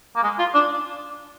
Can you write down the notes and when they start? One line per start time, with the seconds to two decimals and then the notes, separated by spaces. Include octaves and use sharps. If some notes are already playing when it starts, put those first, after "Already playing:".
0.16 A#3
0.24 G#3
0.39 F4
0.54 D4